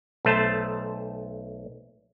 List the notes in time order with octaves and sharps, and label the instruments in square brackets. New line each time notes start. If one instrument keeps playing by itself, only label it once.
[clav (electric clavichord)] B1 A3 C5 A5